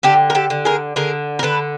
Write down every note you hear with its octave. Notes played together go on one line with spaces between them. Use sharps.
D3 G4 A4
A#4
G4 A4
D3
G#4 A#4
D3 G#4 A#4
A#4
D3 A4 B4